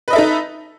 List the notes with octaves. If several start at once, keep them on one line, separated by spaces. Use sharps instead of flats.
D#4 A4 B4 D#5 E5